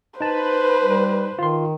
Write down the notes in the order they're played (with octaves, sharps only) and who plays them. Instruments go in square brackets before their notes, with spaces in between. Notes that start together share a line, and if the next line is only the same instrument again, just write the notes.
[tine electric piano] D#4 A5 [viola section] B4 [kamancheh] C5
[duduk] G3
[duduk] D#3 [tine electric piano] F4 C6